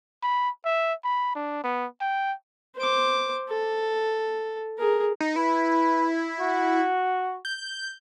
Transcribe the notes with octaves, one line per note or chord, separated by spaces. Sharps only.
B5
E5
B5
D4
B3
G5
C5 D6
A4
G#4 A#4
D#4
E4 B4
F#4
G6